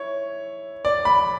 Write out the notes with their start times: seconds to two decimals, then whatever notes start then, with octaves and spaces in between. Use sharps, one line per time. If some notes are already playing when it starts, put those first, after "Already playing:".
Already playing: E4 C#5
0.85 D5
1.05 B5